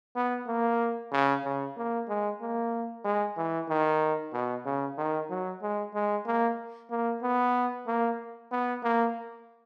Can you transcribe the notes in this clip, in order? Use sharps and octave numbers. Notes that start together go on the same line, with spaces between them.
B3
A#3
C#3
C#3
A#3
G#3
A#3
G#3
E3
D#3
B2
C#3
D#3
F#3
G#3
G#3
A#3
A#3
B3
A#3
B3
A#3